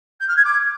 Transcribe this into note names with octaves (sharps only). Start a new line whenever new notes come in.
G6
F6
G#6
D6